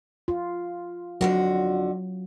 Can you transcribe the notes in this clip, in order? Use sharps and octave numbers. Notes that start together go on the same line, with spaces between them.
F4
F2 D3 F#3 F#4